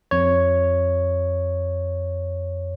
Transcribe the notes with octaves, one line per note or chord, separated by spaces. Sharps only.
F2 C#5